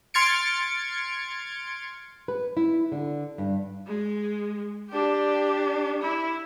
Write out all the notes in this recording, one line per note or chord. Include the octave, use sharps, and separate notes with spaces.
C6 F6 G#6 A6 C#7 D7
B4
E4
D3
G2
G#3
D4 G4
E4